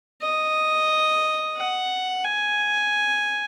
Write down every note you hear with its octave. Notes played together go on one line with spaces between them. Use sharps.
D#5
F#5
G#5